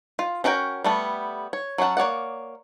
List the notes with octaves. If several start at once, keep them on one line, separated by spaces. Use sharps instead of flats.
F4
C#4 D4 F#4 A#4 G5
G3 A3 B3
C#5
F#3 C#4 G#4 F#5 A5
A#3 C#5 D5 F#5